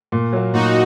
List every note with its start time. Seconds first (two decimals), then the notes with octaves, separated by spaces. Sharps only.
0.12 A#2
0.33 F#3 A#3
0.53 A#2 D#4 F#4